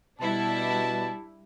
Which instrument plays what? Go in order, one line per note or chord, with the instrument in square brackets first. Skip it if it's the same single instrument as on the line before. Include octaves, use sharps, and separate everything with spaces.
[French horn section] B2 [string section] G3 D4 E4 [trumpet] A5